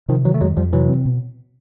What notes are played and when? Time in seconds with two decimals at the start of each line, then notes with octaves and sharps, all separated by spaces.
0.08 C3 D#3 F3
0.25 D#3 E3 F#3
0.34 A3
0.41 F2 F#3 G#3
0.57 F2 F3 G3
0.73 C3 E3 F#3
0.89 C4
1.05 B2